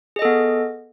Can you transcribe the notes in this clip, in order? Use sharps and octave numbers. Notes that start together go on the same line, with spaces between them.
B3 G#4 A4 D#5